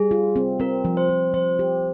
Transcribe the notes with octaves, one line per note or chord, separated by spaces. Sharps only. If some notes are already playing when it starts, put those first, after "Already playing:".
Already playing: G3 G#4
F4
C4
C4 A#4
F3
C5
F3
F3 C5
G4